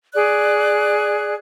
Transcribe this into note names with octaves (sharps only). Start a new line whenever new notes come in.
G#4 D5 F#6